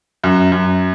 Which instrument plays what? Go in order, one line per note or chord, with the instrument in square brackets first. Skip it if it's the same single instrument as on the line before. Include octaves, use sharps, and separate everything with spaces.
[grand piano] F#2
F#2